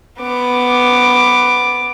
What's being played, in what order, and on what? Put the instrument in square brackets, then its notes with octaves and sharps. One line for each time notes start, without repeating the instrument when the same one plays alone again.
[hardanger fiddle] B3 D6